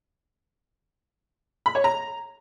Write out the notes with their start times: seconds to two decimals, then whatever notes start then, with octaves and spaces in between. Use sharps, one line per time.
1.66 B5
1.75 C#5
1.84 A#5